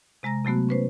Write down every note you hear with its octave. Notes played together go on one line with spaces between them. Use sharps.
C3 G#3 A#5 A#6
C3 F#3 A3 B3 F#4
C#4 B4 C5